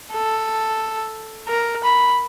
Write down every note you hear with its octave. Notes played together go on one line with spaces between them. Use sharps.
A4
A#4
B5